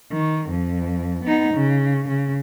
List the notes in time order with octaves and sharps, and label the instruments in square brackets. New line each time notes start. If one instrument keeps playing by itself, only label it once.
[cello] D#3
F2
B3 D#4
C#3
C#3